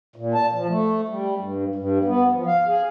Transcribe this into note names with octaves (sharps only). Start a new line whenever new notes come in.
A#2
A5
F3
A3
G3
G2
G2
B3
F3
F5
G#4